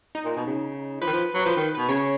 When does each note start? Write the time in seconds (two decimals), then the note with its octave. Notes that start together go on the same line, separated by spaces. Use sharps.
0.15 D#4
0.25 A#2
0.36 B2
0.46 C#3
1.01 F3 B4
1.07 D#3
1.12 F3
1.34 F#3
1.45 F3 B4
1.56 D#3
1.75 B2 B4
1.89 C#3 C#5